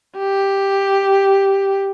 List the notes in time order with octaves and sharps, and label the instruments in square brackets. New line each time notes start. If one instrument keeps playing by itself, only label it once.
[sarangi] G4